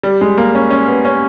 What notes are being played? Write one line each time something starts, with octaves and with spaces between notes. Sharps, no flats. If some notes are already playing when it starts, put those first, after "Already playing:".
G3
G#3
A#3
C#4
C#4
B3
C#4